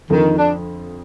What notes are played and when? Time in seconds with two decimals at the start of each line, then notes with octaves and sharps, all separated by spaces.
0.10 F2 D3 D#3 F3
0.38 D4